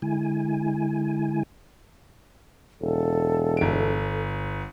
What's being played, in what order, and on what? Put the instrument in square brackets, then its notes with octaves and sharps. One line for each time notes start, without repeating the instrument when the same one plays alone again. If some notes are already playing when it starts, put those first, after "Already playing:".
[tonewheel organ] D3 G#3 E4 G#5
[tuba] E1 [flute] A4
[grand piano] G1 D7